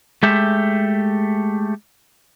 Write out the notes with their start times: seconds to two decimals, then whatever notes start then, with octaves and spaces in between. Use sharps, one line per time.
0.23 G#3 A3 G4 E5